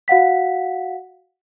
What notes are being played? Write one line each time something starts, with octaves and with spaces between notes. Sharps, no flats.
F#4 F5 F#5 B6